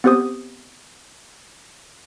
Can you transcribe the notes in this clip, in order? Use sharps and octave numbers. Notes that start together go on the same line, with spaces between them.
B3 C4 G4 C5 D#6